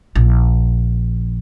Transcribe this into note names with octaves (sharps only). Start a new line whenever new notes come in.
A#1